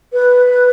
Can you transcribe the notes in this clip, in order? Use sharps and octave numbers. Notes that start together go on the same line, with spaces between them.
B4